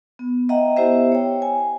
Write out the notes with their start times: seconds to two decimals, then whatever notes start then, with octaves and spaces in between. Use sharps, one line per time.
0.19 B3
0.49 D#5 E5 F#5 G5 A#5
0.77 B3 E4 G4 C5 E5
1.12 C#5 G5
1.42 G#5